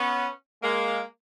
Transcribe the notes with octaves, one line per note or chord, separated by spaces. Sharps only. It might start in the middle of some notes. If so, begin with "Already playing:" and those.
Already playing: B3 C#4
G#3 A#3